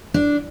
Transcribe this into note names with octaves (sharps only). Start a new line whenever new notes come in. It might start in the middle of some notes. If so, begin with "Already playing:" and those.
D4